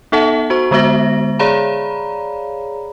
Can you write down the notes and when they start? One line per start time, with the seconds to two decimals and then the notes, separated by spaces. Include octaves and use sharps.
0.12 B3 D#4 A4 E5 F#5 A5
0.50 F#4 C5 C#6
0.71 D3 G#3 B3 C5 E5 A#6
1.39 G#4 C#5 D5 F5 A#5 B5